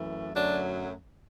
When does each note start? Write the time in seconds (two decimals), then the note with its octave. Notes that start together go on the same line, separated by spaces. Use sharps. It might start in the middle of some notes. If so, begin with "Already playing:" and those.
Already playing: F#2 E3 A3
0.34 F#2 D3 F#3 A3 D4